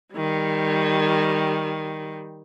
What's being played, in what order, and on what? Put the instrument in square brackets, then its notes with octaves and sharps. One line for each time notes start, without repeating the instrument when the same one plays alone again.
[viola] D#3 G3